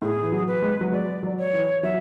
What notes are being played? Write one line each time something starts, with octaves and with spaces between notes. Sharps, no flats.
A2 G#4
E3
F#3
B4
G#3
F#3
G#3 D5
F#3
C#5
E3
F#3 E5